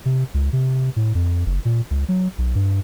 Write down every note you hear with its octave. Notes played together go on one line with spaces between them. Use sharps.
C3
C#2
C3
A2
F2
F#1
A#2
C#2
F#3
B1
G2